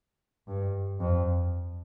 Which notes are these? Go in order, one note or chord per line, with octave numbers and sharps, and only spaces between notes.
G2
F2